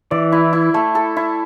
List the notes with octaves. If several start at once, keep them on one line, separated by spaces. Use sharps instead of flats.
E3 D5
E4
E4
A3
A4
E4